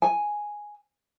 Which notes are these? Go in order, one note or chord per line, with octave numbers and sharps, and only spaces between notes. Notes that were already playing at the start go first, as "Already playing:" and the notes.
G#5